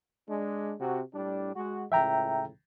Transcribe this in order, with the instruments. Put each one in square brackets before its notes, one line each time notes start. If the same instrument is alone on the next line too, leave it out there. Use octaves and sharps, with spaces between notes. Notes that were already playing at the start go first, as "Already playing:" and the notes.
[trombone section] G#3 D4
C3 F#4
A2 G3 D4
G#3 F#4
[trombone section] C#2 A2 [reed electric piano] E5 G5 A#5